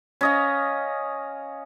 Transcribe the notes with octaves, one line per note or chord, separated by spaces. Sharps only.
C#4 D#5 F5